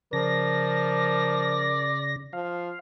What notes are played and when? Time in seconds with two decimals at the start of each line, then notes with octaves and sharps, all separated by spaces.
0.13 C#3 F3 A#4 D5 A#6
2.33 F3 F5